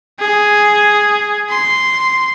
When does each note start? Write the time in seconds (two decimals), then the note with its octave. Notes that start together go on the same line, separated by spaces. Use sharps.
0.20 G#4
1.50 C6